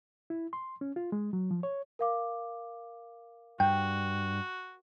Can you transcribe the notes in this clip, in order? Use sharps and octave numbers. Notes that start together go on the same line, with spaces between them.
E4
C6
C#4
F4
G#3
F#3
F3
C#5
A#4 F5 D6
G2 F#4 G5